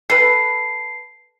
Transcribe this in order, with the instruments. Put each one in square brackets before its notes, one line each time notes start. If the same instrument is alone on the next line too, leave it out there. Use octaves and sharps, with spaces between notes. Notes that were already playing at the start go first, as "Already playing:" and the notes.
[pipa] A4 B4 [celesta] C7